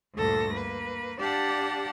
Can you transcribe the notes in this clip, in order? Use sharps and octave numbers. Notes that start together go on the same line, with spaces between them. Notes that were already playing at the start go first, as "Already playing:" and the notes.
D2 G2 A#2 A4 A#6
A#3 B4
D4 G4 D5 F5 F#5 A5